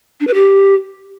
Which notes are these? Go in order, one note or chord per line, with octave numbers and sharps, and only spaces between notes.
D4
B4
G4